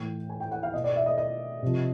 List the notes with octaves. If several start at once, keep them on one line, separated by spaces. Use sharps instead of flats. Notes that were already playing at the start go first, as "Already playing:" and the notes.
Already playing: A2 E3 G5
G#5
G5
F#5
F5
B2 D#5
D5
E5
D#5
D#5
C3 F3